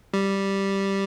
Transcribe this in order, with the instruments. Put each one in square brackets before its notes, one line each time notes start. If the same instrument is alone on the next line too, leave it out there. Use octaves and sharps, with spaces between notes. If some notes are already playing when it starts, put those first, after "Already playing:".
[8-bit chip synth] G3